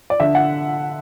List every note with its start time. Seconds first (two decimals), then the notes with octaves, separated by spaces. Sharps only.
0.10 D5
0.20 D3 E5
0.35 F#5